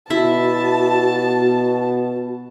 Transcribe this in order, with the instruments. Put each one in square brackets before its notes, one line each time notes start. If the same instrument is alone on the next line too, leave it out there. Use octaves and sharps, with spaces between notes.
[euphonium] B2 [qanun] E4 E5 [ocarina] F#4 [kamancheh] A5